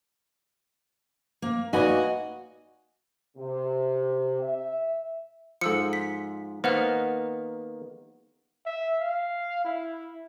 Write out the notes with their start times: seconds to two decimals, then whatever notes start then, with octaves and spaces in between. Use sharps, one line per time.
1.42 A#3
1.73 A#3 D#4 F#4 B4 D5 D#5 G#5
3.37 C3
4.42 E5
5.61 G#2 F3 A4 E6 C#7
5.93 B6
6.64 D#3 A#3 B3 C5 F#5 F6
8.66 E5
9.00 F5
9.65 E4